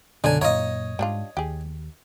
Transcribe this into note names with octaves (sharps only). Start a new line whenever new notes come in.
B1 F#2 B2 D3 D4 D#4 C#5 G#5
F#2 A#2 D#4 F4 C#5 D#5
G#2 G3 D4 F4
D#2 G4 G#4